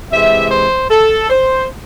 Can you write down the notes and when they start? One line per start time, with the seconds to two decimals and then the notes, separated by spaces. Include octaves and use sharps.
0.12 C3 E3 G#3 E5
0.51 C5
0.91 A4
1.30 C5